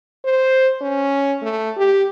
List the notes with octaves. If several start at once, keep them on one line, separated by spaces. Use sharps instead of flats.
C5
C#4
A3
G4